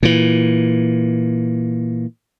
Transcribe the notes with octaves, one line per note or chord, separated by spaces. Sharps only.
A#2 E3